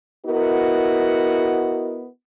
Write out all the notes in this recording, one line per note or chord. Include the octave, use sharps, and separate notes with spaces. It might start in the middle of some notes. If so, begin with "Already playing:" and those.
B3 E4 F#4 A#4 D#5